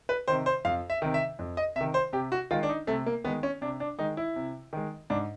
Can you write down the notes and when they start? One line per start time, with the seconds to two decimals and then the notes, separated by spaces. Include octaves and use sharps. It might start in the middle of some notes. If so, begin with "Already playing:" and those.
0.09 B4
0.28 C3 D#3 C5
0.46 C5
0.65 F2 F5
0.90 E5
1.02 C3 D#3
1.14 E5
1.39 F2
1.57 D#5
1.76 C3 D#3 E5
1.94 C5
2.13 C3 G4
2.32 F#4
2.51 D#3 G#3 F4
2.63 D4
2.69 D#4
2.87 C3 A3
3.06 A#3
3.24 D#3 G#3 B3
3.43 C#4
3.62 C3 D4
3.80 D4
3.99 D#3 G#3 D#4
4.17 E4
4.36 C3
4.73 D#3 G#3
5.10 G#2 D4